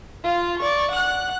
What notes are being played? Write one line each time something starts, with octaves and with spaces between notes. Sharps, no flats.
F4 F5
D5 C#6
F#5 F#6